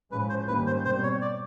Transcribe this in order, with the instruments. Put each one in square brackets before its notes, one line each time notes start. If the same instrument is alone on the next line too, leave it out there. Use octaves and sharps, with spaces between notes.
[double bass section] A2 F3 G#3 C#4 [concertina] B4
[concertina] C5
[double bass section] G#2 D#3 G3 A#3 C#4 [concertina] B4
[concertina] C5
[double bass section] B2 G3 C4 [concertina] C5
[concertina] C#5
D5